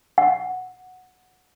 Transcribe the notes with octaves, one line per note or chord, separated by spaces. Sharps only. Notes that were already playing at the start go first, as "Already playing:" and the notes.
F#5